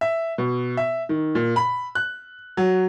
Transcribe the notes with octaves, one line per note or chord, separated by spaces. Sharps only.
E5
B2
E5
D#3
A#2
B5
F#6
F#3